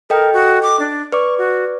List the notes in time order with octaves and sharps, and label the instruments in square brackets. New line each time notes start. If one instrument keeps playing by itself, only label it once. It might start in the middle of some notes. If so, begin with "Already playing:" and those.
[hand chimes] A4 D#5 G5 [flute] A#4
[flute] F#4
D6
D4
[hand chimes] B4 D5 D6 [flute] C#6
[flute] F#4